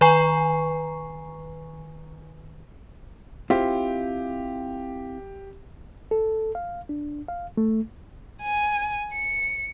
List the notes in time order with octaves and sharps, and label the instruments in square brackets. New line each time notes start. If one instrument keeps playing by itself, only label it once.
[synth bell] D#3 B4 G#5 A#5 C#6 C7
[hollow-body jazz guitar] C4 E4 F4 [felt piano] G4
[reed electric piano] A4
F5
D4
F5
A3
[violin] G#5
C#7